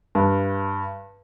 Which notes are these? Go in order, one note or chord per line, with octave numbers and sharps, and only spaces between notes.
G2